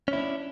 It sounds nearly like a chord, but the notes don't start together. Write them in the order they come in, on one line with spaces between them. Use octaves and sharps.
C#4 E4 D4